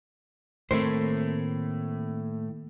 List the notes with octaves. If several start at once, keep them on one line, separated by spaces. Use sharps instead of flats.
A2 D#3 A3 A#3 C4 A#4 C5